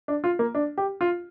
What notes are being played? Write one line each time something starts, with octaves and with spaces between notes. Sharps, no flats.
D4
F4
A#3
D4
G4
F4